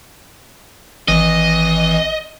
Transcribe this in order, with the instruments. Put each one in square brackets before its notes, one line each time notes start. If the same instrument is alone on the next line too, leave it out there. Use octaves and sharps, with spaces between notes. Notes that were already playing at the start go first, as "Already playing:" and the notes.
[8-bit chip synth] G#1 E3 [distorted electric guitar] D#5